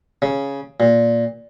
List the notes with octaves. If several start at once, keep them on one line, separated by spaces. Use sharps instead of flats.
C#3
A#2